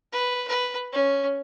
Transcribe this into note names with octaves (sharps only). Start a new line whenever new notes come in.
B4
B4
C#4